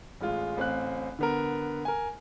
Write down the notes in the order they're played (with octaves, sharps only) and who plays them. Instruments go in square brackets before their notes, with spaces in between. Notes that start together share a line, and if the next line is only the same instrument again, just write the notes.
[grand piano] A1 G#3 F4
A1 C4 F5 F#6
D3 B3 A#4
A#4 G#5